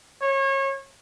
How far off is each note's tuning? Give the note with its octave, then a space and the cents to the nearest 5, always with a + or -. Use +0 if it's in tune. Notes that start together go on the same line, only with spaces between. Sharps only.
C#5 -30